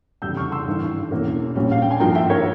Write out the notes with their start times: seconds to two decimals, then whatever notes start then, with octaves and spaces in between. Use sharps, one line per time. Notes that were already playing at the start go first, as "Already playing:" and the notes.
0.22 F1 E2 C#3 G3 E6 G6
0.37 C#6 F6
0.52 C6 E6
0.67 G#1 G2 E3
1.11 E1 E2 E3 A#3 C#4
1.55 A#1 A#2 G3 C#4
1.71 F5
1.82 G5
1.91 G#5
2.00 G#1 G2 F3 A#3 G5 A#5
2.15 E5 G5
2.30 A#4 C#5